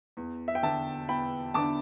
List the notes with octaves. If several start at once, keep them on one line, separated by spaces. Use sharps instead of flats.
E2
E5
G5
D3 B3 D4 E5 A5
E2 G5 B5
D3 B3 D4 A5 D6